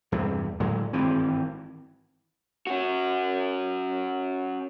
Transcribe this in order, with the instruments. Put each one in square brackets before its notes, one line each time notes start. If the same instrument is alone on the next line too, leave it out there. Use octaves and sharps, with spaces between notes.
[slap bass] E2 G2 C3
A2 D3 F#3 G#3
G#1 G2 E3 C4
[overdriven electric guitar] C#4 F#4